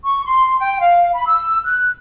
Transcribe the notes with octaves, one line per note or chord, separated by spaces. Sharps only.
C#6
C6
G5
F5
B5
E6
F#6